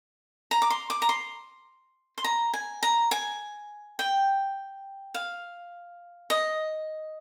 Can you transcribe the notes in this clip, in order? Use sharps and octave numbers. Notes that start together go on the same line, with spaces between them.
A#5
D6
C6
D6
A#5
C6
C6
A#5
G#5
A#5
G#5
G5
F5
D#5